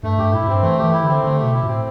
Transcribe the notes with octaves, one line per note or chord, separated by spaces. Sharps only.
G2 A3
G2 G4
A2 E4
A2
G2 C4
E3 A3
G4
E3
E4
D3 C4
D3 A3
B2 G4
E4
A2 C4